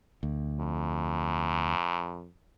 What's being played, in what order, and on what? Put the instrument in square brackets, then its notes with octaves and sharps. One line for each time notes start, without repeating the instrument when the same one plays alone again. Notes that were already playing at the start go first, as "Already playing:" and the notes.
[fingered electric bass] D2
[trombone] F2